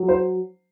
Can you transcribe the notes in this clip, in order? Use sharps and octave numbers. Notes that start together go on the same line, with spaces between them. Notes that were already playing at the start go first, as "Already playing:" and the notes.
Already playing: F#3
C5